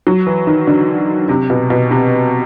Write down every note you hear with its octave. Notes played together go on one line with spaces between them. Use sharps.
F#3
E3
D#3
D3
C3
B2
B2
C3